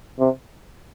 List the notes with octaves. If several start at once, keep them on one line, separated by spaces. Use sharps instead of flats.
C3